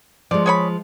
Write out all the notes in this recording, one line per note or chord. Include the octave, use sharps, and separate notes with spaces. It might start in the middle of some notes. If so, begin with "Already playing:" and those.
F3 G#3 D5
G#4 C#5 B5